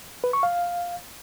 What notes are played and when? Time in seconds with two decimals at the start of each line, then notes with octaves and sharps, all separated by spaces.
0.24 B4
0.33 C#6
0.43 F5